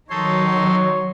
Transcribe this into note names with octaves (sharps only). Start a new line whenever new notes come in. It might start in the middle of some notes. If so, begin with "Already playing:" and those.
D#3 F#3 D#4 A4 C#5 C6